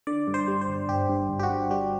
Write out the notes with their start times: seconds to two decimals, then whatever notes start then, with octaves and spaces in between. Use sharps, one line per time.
0.07 D3 D5
0.28 G2
0.34 C5
0.48 G3
0.61 C5
0.68 G1
0.89 G1 G4
1.09 G2
1.30 G1
1.39 G4
1.43 F#4
1.50 G2
1.71 G3 G4